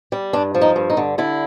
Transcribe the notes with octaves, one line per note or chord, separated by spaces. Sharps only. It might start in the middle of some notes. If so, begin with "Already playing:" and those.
G3
G2 D4
F3
D#4
G2
D#4
D3
D3 E4